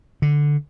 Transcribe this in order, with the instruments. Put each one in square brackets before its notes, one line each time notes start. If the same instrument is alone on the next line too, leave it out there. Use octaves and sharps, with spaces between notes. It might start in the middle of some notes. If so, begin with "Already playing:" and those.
[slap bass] D3